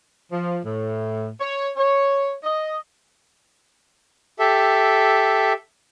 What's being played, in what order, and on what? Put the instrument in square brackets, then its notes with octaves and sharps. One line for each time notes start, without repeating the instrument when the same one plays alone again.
[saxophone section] F3
A2
C#5
C#5
D#5
[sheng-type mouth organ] G4 A4 E5